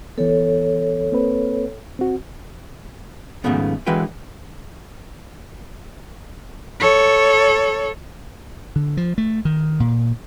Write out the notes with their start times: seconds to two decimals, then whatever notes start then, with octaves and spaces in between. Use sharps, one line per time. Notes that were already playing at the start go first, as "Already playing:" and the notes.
0.18 E3 B3 A4 C#5
1.12 A#3 C4 B4
1.99 C4 F#4
3.44 D#2 G#2 C#3 F3 A3 B3
3.86 D3 E3 G#3 F#4 B4 G5
6.80 A4 C#5
8.76 D3
8.97 F3
9.18 A3
9.45 D#3
9.80 A#2